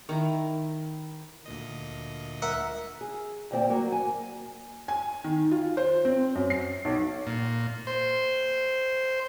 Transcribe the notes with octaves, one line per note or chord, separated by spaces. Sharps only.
D#3 E4 A#5
D2 A#2 D#5
A#4 E5 F#5
G#4
D2 A#2 C4 D5
F#3 A#3 F#4
G#5
G#5
D#3
F4
C5
C4
F#2
C7
B1
A#2
C5